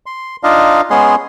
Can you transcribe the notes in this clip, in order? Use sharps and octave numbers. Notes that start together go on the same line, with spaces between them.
C6
D4 D#4 F4 D#5 F5
G#3 B3 C#4 G#4 C6